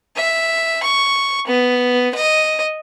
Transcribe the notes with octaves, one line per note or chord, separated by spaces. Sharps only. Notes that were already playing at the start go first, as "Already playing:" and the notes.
E5
C#6
B3
D#5